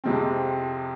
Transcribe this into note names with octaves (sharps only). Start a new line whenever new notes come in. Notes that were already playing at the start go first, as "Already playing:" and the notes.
F2 C3 F3 G#3 C4